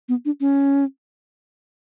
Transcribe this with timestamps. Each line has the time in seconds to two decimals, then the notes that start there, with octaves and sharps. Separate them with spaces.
0.09 B3
0.25 D4
0.40 C#4